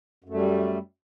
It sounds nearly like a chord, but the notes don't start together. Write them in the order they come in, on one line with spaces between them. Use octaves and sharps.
F#2 A3 G3